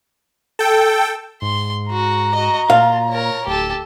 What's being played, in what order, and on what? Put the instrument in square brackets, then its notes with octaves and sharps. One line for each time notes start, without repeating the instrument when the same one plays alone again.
[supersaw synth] A4 G5
[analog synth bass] G#2 [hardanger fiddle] C6
[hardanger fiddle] F#4 [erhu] A#5
[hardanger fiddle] F#4 D#5
[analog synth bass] A#2 [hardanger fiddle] F4 [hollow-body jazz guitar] F5
[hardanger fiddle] A#4 C#5
[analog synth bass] D1 [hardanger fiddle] G4 A4